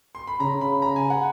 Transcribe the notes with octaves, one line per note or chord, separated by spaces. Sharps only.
C6
B5
C#3 A#5
B5
A#5
G#5
F#5